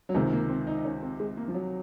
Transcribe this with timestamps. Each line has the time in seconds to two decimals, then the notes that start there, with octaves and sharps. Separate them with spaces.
0.09 F#3
0.15 C#2 C3 D#3 G#3
0.32 A#3
0.49 C4
0.67 D#4
0.77 D#4
0.85 C#4
1.03 C4
1.20 G#3
1.37 A#3
1.48 F3
1.54 F#3